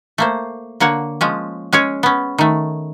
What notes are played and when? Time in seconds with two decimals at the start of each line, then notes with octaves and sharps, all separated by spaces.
0.18 A3 A#3 C5
0.80 D3 A#3 C#5 F#5
1.21 F3 G#3 C#4
1.73 G#3 C#4 G#4 C#5
2.03 B3 C#4
2.38 D#3 A3